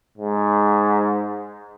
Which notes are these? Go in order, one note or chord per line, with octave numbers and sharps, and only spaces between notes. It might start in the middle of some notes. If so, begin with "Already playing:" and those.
G#2